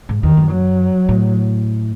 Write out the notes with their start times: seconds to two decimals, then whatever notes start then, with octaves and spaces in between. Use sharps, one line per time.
0.09 G#2
0.23 E2 D#3
0.37 F#2
0.52 F#3
1.09 A2